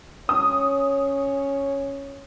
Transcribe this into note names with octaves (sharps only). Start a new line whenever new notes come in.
C#4 C#5 D#6